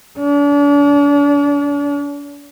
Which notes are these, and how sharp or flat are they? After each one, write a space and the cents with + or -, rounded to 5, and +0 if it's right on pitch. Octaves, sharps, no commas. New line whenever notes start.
D4 -40